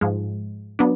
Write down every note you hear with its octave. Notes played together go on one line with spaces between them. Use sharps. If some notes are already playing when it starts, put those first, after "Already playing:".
G#2 F3 G#3
F#3 B3 D4